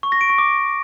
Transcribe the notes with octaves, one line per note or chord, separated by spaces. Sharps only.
C#6
A#6
D7
C#6
D6